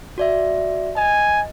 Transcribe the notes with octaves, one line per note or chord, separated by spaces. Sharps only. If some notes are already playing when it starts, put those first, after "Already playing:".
F#4 D5 E5
D#5 G#5